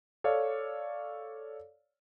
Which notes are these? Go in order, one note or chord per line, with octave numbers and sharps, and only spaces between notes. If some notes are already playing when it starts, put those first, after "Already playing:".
A4 C#5 D5 F5